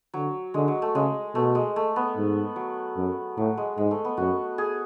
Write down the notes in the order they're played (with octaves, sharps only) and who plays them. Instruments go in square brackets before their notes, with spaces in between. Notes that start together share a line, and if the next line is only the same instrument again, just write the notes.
[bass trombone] D3 [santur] F#3
[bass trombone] D3 [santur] G#3
[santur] F#3
A3
[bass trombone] C#3 [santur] G#3
[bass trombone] B2 [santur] A3
[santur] G#3
A3
B3
[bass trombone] G#2
[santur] F#3
[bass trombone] F#2
[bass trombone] A2 [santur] F#3
[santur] G#3
[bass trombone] G#2 [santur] G#3
[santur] A3
B3
[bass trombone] F#2 [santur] F#4
[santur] G#4